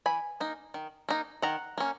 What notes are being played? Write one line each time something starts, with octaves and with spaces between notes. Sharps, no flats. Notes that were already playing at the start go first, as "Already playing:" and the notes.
E3 G#5 B5
A#3 D#4
D#3
A#3 D#4
D#3 F#5 A#5
A#3 C#4